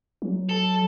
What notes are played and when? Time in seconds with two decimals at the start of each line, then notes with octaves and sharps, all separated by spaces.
0.22 F#3
0.49 A4